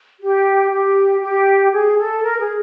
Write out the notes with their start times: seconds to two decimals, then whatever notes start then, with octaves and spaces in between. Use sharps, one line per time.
0.21 G4
0.71 G4
1.22 G4
1.72 G#4
1.98 A4
2.22 A#4
2.39 G#4